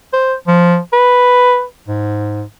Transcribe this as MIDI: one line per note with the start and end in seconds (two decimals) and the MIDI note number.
0.13 0.34 72
0.48 0.78 53
0.93 1.64 71
1.88 2.43 44